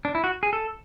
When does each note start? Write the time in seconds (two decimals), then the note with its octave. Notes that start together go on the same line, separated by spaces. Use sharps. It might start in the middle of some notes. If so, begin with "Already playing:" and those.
0.05 D4
0.15 E4
0.24 F#4
0.43 G#4
0.53 A4